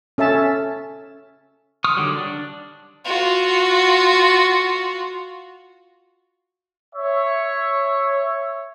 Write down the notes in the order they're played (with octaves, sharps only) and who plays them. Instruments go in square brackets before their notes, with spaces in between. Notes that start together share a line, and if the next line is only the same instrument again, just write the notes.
[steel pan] C#4 A4 E5 A5
[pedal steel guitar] C6 C#6 D#6 F6
D3 D#3 F#3 G3
D4
[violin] F4 F#4
[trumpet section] C#5 E5